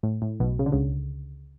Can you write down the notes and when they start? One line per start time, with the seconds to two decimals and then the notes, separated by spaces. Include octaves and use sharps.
0.03 A2
0.22 A2
0.40 B1 B2
0.59 C#3
0.66 D3
0.72 C#2 C#3